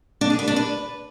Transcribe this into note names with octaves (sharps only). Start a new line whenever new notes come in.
D4
G#4
B4
D4
B4